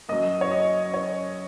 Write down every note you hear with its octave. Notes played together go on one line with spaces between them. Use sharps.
F#2 F#3 D#5
C#5
D#5
C#5